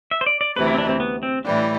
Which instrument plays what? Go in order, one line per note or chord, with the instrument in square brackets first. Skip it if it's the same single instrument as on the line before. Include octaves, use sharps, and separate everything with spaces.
[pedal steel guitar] E5
C5
D5
D5
[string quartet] D2 C3 E3 [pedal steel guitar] B4
[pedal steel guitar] E4
C4
D4
C4
B3
C4
[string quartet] A2 E3 G3 [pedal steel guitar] D4